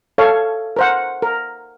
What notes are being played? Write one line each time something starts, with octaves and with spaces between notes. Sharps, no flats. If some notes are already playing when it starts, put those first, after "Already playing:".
A4 C#5 F5
A#4 C5 F#5
A#4